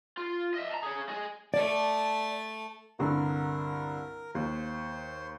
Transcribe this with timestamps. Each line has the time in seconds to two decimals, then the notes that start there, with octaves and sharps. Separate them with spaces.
0.18 F4
0.54 D#5 E5
0.71 A5 A#5
0.83 G#4 C#5
1.09 G#4 D#5
1.54 A3 D5 A5
2.99 C2 G2 D3 A#4
4.35 D#2 C5